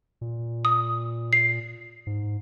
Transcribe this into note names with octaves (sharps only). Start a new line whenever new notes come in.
A#2
D#6
C7
G#2